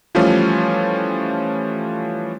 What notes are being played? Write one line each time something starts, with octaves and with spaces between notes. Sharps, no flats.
E3 F3 G3 A3 C#4 F4